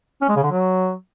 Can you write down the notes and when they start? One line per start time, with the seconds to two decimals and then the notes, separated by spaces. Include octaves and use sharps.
0.22 C#4
0.29 G#3
0.36 C#3
0.43 D3
0.51 F#3